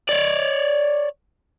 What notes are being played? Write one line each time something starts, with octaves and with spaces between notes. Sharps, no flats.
C#5 D5